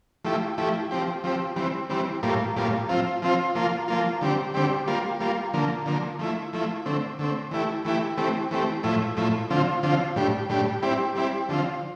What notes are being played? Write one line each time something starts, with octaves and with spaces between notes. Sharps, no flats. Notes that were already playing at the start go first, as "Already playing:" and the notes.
F3 A3 E4 G4
F3 A3 E4 G4
F3 C4 G4
F3 C4 G4
E3 G3 C4
E3 G3 C4
A2 G3 A#3 F4
A2 G3 A#3 F4
F3 C4 F4
F3 C4 F4
F3 A#3 F4
F3 A#3 F4
D3 G3 C4 G4
D3 G3 C4 G4
G3 A#3 F4
G3 A#3 F4
D3 F3 A#3
D3 F3 A#3
F3 A3 E4
F3 A3 E4
D3 A3 C4
D3 A3 C4
E3 A3 E4 G4
E3 A3 E4 G4
E3 A3 C4 G4
E3 A3 C4 G4
A2 F3 A3 E4
A2 F3 A3 E4
D3 F3 C4 F4
D3 F3 C4 F4
A2 G3 D4 G4
A2 G3 D4 G4
G3 C4 E4 G4
G3 C4 E4 G4
D3 F3 C4 F4